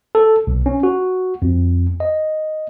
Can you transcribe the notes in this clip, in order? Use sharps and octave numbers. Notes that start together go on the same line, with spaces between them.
A4
B1
C#4
F#4
F2
D#5